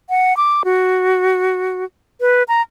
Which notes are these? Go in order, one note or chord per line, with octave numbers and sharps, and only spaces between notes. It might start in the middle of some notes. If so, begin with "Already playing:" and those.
F#5
D6
F#4
B4
A#5